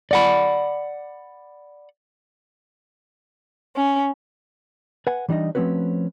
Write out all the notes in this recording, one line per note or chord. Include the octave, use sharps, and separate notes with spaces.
D5 F#5 B5
C#4
B4 F#5 G#5
E3 G3 D4 D#4 D#5
F3 A3 C4 C#4 F#4 B4